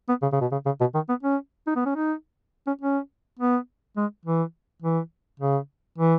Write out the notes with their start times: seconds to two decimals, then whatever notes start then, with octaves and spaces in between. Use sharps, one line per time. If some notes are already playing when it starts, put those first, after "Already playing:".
0.09 B3
0.22 C#3
0.33 C#3
0.41 B2
0.52 C#3
0.66 C#3
0.80 B2
0.94 D#3
1.09 B3
1.23 C#4
1.67 D#4
1.76 B3
1.86 C#4
1.95 D#4
2.67 C#4
2.81 C#4
3.39 B3
3.97 G#3
4.25 E3
4.82 E3
5.40 C#3
5.98 E3